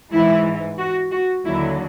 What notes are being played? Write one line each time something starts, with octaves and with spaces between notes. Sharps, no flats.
G#2 E3 E4
F#4
F#4
D#2 D3 F#3 E4